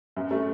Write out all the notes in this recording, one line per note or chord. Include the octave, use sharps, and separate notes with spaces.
F#2
A3